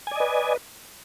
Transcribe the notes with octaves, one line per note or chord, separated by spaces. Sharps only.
B4 D5 D#5 G#5